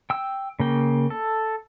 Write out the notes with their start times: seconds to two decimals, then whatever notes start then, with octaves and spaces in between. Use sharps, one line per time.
0.10 G5 E6
0.60 C#3 A#3 G5
1.10 A4